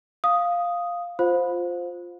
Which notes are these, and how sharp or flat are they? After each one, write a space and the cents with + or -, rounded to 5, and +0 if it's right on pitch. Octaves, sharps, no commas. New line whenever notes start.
F5 +0 D#6 +0
F4 +5 C5 +0 F5 +35